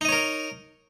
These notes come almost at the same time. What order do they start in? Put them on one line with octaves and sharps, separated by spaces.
D#4 D#5 C#5 A#4